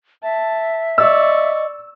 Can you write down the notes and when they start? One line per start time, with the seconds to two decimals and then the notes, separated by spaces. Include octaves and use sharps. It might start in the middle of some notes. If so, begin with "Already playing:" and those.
0.23 E5 A5
0.98 D5 D#5 C#6 E6